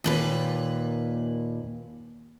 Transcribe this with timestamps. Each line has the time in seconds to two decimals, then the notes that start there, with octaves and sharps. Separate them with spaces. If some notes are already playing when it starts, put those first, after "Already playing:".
0.04 D#2 A#2 B4